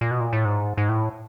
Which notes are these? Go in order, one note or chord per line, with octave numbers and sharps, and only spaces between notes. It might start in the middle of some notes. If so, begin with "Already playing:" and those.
A#2
B2
A#2
A2
G#2
G#2
A2